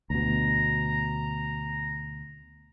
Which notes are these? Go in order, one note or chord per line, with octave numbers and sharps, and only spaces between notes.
D2 B2 A#5